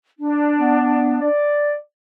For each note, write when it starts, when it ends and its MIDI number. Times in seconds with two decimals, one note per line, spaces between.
0.18 1.27 62
0.59 1.17 59
1.21 1.74 74